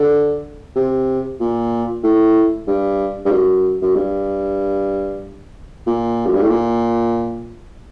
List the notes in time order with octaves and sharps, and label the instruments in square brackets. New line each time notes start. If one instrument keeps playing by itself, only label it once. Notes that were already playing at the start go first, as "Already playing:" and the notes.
Already playing: [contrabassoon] D3
C3
A#2
A2
G2
G2
F#2
F#2
G2
A#2
F#2
G2
A2
A#2